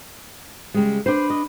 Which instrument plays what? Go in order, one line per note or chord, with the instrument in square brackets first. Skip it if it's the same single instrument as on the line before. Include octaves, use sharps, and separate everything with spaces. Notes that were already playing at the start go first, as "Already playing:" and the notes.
[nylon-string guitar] C#3 G3 G#3
[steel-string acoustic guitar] D4 B4 [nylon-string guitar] C5
[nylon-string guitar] D#5